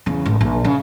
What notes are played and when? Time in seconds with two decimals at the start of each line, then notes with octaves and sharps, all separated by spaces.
0.06 E2 C#3
0.26 G#1
0.41 A#1 E3
0.64 C#3